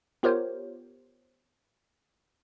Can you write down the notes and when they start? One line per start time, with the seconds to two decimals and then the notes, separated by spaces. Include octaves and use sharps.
0.23 B3 F4 G4 A#4 C5 C#5